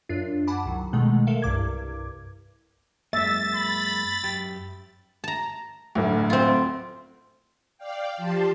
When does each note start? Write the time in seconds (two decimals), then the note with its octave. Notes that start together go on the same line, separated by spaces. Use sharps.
0.09 F#2 D4 F4
0.47 F#5 G#5 A5 B5 D6
0.66 C2 D#3 F#3
0.93 B2 D#3 G#3 A3
1.27 A4 A#4 E5 F5
1.42 C2 G2 D6 G#6
3.13 F#2 G#3 A#3 E5 A6
3.55 B5
4.23 F#2 G4
5.24 A5 A#5
5.95 D1 D2
6.30 C4 F4
7.78 D5 F5 G5
8.17 F3 G4 A5 C6